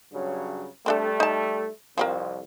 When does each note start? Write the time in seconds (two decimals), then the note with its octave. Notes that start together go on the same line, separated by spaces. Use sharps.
0.13 G2 C#3 F#3
0.86 G3 A3 C4 D4 A4
1.20 D#4 A5
1.98 C2 F2 F3 C4 A#4